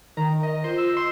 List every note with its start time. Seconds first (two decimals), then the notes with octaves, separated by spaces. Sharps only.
0.17 D#3 A#5
0.43 D#5
0.64 F4 C5
0.78 E6
0.97 C6